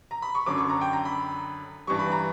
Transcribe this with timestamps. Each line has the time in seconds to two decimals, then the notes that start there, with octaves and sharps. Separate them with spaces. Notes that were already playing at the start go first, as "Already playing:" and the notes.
0.11 A#5
0.22 B5
0.35 C#6
0.46 F#2 D3 F#3 D6
0.58 C#6
0.70 A#5
0.81 G5
0.93 A#5
1.05 B5
1.87 G2 E3 G3 C#6
1.99 B5
2.12 A#5